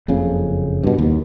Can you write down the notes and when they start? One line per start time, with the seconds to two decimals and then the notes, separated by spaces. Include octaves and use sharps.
0.08 F#1 F2 C#3
0.83 G2 B2
0.98 D#2